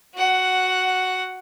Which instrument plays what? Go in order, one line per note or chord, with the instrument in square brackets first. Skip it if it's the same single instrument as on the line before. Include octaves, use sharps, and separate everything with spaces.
[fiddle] F#4 F#5